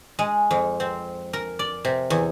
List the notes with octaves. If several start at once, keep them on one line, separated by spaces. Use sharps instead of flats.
G#3
F2
C4
A#4
D5
C3
E2